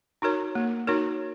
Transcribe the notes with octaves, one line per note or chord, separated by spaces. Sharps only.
D#4 F#4 A#4 C#5
A#3
D#4 F#4 A#4 C#5